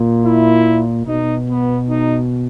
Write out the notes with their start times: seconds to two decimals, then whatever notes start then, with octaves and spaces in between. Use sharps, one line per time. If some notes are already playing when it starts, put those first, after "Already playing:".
Already playing: A#2
0.24 E4
1.06 B2 D#4
1.48 B3
1.89 D#4